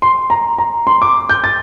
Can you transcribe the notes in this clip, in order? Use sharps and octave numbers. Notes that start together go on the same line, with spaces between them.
C6
A#5
A#5
C6
D6
G6
A6